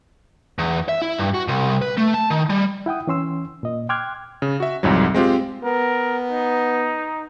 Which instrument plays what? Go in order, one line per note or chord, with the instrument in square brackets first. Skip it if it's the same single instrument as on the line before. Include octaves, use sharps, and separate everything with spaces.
[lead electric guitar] E2
E5
E4
G2
F#4
C2
B4
A3
A5
D#3
G3
[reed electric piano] E4 F#5 G5 D#6
E3 C#4 C6 E6
A#2 D#5
G5 C6 D6 F6 F#6 G#6
[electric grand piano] C#3
F#4 E5
C2 F2 G#2 F#3
G#3 C4 F4 G4
[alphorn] B3 [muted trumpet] A#4
[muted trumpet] D#4